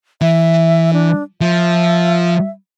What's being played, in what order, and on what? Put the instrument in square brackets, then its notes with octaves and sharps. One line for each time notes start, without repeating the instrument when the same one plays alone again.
[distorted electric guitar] E3 [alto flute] E5
[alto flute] D4
[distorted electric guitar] F3 [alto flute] E5